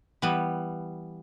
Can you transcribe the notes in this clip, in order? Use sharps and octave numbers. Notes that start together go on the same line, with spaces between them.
E3 G3 B3